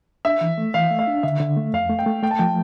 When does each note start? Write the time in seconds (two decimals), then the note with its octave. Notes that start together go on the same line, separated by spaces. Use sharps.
0.25 D4 E5
0.41 E3
0.58 A3
0.74 E3 F5
0.91 A3
0.99 F5
1.07 D4
1.23 D3 E5
1.40 D3
1.57 A3
1.73 F2 F5
1.90 A3
1.99 G5
2.06 A3
2.23 A3 G5
2.31 A5
2.39 F3 G5